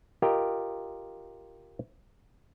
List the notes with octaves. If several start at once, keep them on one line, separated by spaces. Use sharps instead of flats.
F4 G4 A#4 D#5 G5